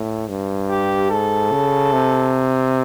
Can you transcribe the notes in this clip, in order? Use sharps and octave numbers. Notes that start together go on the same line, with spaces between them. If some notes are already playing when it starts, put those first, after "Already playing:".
Already playing: A2
G2
G4
G#2 A4
C#3
C3